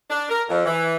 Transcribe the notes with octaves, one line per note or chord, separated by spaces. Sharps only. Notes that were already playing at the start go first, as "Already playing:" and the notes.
D4
A#4
F2
E3